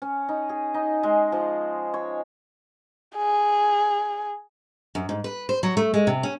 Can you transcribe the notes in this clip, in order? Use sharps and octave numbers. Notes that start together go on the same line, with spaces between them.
C#4
D#4
G#4
D#4
G#3
F3
C#5
G#4
F#2
G#2
B4
C5
F#3
A3
G#3
C3
C#4